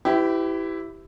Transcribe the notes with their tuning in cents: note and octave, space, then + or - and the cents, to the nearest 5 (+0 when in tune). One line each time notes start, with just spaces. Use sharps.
E4 +0 G4 -20 B4 +35